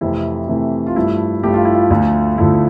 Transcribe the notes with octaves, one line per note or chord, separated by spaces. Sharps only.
F2 C3 E3 A3 E4
F2 C3 E3 A3
F4
G2 F3 A3 E4
G2 F3 A3 G4
F4
E4
F4
D2 D3 F3 A3
D2 D3 F3 A3 E4